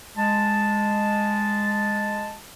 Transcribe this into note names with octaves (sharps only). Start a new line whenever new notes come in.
G#3 A5